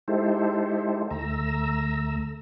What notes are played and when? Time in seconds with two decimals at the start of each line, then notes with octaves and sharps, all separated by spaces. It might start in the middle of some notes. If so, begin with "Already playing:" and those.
0.08 G#3 D#4 E4 G4 A4 C5
1.10 D2 A3 A#5 E6